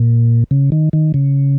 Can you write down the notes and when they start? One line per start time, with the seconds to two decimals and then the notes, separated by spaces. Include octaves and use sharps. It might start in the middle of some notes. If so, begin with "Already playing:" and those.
Already playing: A#2
0.51 C#3
0.72 D#3
0.93 D#3
1.14 C#3